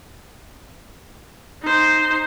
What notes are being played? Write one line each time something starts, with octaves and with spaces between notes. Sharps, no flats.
D#4 C5